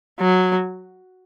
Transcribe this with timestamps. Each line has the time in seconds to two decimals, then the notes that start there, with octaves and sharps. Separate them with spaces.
0.20 F#3